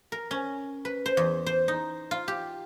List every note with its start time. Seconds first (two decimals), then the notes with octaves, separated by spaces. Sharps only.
0.12 A#4
0.31 C#4
0.85 B4
1.06 C5
1.17 E2
1.46 C5
1.68 D#4
2.11 F4
2.28 G4